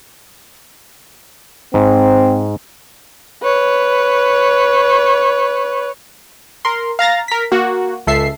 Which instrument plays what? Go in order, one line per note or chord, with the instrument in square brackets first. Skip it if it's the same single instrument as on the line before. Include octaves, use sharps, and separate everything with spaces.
[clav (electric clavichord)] G#2 [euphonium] C4
[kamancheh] B4 C#5
[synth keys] A#4 C6
F5 A#5 A6 A#6
A#4 B6
A#3 F#4
C#2 A4 E5 C7